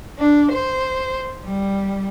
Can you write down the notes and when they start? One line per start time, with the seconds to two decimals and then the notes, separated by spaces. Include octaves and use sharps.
0.19 D4
0.52 C5
1.45 G3